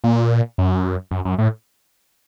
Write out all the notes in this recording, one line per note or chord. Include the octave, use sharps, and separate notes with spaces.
A#2
F#2
F#2
F#2
A2